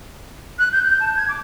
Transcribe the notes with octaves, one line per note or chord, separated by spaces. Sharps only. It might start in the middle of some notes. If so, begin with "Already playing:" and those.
F#6
G6
G6
A5
G#6
D6